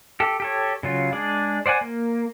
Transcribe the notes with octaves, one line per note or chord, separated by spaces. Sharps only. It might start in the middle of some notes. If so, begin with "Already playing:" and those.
G4 A4
G4 A4 C#5
C#3 F#3 F4
G#3 D4 G#4 D5
C5 D5 F#5 G#5
A#3